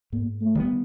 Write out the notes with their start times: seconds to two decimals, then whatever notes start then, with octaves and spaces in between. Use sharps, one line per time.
0.12 G#2 A#3
0.41 A3
0.55 D#3 G3 B3